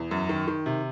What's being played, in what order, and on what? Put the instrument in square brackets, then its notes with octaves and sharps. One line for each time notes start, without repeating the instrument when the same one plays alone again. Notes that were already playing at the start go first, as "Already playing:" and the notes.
Already playing: [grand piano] E2
F#2
D#3
D#3
C3